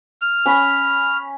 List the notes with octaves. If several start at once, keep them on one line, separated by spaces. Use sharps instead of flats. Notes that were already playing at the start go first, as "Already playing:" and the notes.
F6
C#4 B5